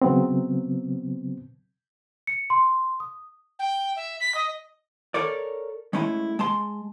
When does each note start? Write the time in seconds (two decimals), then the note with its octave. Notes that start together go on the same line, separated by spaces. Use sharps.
0.02 C#3 F#3 B3 C4
2.27 C#7
2.50 C6
3.00 D#6
3.59 G5
3.96 E5
4.20 B6
4.35 D#5
5.14 A4 A#4 C#5 D5
5.93 G#3 A3 C#4 E4
6.39 G#3 A5 C6